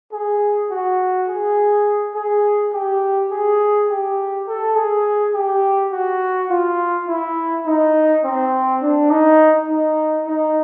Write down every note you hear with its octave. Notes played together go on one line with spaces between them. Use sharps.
G#4
F#4
G#4
G#4
G4
G#4
G4
A4
G#4
G4
F#4
F4
E4
D#4
C4
D4
D#4
D#4
D#4